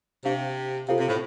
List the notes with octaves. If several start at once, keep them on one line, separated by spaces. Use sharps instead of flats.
C3 D4 G4 C5 F5
C3 F4 A4 C5 F5
C3
A2